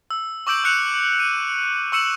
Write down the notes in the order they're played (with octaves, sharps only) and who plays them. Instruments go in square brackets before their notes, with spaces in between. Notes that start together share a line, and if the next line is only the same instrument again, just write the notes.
[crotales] E6
C#6 D6 E6 G6 D7 F#7
E6 F#6 C#7 F7
D#7
C#6 E6 C#7 E7 F#7